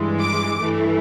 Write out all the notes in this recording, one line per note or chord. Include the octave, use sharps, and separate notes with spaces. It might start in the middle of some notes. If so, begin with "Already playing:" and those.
Already playing: G2 E3 G#3
D6
G2 E3 A3